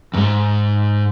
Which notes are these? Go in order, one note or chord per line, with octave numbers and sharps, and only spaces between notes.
F2 G#2